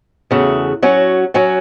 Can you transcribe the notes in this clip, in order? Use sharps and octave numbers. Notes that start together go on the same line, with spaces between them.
E2 C#3 A3 F#4
F#3 C#4 F#4
F#3 C#4 F#4